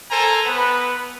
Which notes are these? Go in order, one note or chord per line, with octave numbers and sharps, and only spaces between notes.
A4 A#4 C5 G#5 A#5
B3 B4